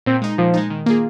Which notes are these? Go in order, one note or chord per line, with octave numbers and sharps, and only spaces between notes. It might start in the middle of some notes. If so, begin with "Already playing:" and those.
A#2 C4
G#3 D#4
A#2 F3
G#3 D#4
D#3
A#3 F4 G#4